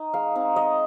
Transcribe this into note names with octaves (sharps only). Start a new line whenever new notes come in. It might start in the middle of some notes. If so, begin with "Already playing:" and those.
Already playing: D#4 D#5
G#3 F5
C4 D#4
G#3 D#5